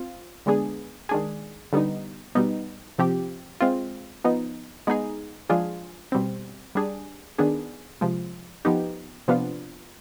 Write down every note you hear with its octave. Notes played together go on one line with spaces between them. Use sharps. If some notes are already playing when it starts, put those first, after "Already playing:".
Already playing: C4 F4
D3 G#3 B3 D4 G#4
D#3 G#3 D4 G#4
D3 G3 B3 D#4
B2 G3 B3 D#4
C3 F3 C4 G4
G#3 C4 F4
F3 B3 D#4
G#3 B3 D#4 G#4
F3 G#3 D4 F4 G#4
B2 G3 C4
G3 D4 G#4
D#3 B3 D4 G#4
C3 F3 G#3
F3 B3 D#4 G4
C3 F3 B3 D4 F4